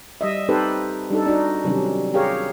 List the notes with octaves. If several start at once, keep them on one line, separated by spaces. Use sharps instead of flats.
G3 D#5 E5
C4 D#4 G4 A4 B4 C5
G3 D4 D#4 A4
D4 D#4 F#4
C3 D#3 F#3 G3 C#4 D4
G4 G#4 A#4 C#5 F5